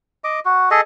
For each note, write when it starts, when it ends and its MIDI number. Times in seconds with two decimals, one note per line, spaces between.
0.24 0.40 75
0.24 0.40 86
0.45 0.69 66
0.71 0.81 68
0.71 0.81 69
0.71 0.81 75